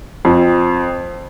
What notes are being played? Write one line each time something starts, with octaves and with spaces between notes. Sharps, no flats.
F2